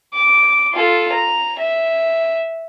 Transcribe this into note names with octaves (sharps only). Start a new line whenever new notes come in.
D6
F4 A4
A#5
E5